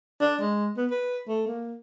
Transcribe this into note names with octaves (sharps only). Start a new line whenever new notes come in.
D4
G#3
B3
B4
A3
A#3